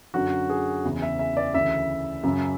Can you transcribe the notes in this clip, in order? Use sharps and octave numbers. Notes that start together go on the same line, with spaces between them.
F#2 D3 F#3 F#4
G#4
E2 C#3 E3
E5
E5
D5
D2 C#3 E3 E5
F#2 C#3 F#3